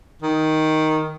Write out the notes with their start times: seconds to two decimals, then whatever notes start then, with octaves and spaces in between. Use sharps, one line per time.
0.22 D#3